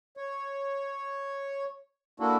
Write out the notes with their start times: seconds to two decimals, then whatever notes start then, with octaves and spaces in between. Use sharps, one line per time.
0.17 C#5
2.20 A#3 D4 E4 F#4 A4